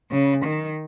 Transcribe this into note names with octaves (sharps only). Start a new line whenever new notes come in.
C#3
D#3